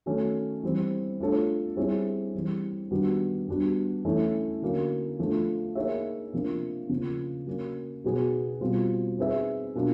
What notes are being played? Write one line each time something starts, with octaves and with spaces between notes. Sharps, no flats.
D#3 F#3 A3 C#4
E3 G3 C4
A3 D4 F4 A4 C#5
G3 C4 E4 G#4 C#5
E3 G3 C4
D#3 G3 B3 D4 F#4
G3 B3 D4 F#4
E3 A3 C#4 E4
D3 F#3 A#3 C#4
F3 A3 D4
A#3 D#4 G#4 C#5 E5
C3 F3 A#3 D4
C#3 F3 A#3
F#3 A#3 C#4
B2 F#3 B3 D#4 G#4
B2 G3 C4 F4
C4 D#4 G#4 B4 E5
B2 F#3 A#3 D4 F4